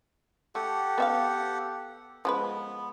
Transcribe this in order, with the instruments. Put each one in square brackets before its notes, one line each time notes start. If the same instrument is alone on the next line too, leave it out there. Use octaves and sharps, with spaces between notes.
[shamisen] A3 [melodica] G4 A4 F#5
[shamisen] B3 E5 F5
[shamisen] F3 G#3 B4 [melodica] B3